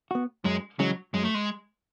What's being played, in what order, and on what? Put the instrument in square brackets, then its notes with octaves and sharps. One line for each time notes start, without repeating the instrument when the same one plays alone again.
[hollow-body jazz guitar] B3 F#4
[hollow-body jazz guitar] F#2 [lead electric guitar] G#3
[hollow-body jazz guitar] C#3 E3 G#3 C#4 [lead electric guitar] F#3
[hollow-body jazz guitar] F#2 [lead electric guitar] G#3
[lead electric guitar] A3
G#3